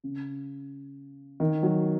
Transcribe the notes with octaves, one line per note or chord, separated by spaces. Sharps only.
C#3
D#3
F#3